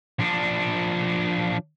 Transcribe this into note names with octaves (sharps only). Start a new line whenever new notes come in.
F3 D4